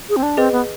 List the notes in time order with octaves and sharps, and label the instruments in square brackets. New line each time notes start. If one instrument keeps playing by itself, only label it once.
[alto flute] G#4
C4
D4
[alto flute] C4 [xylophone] G#4 B4 D#5
[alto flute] B3